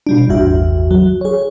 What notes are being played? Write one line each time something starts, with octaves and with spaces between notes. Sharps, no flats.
B2 G3 D4
A1 E2 G2 F#4 E5
F#3
G#4 C#5